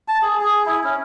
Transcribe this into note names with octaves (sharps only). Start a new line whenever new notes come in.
A5
G#4
G#4
E4
C#4